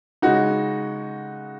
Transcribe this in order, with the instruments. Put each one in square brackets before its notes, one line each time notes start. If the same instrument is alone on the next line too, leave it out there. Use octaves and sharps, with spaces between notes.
[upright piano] C#3 G#3 D#4 F#4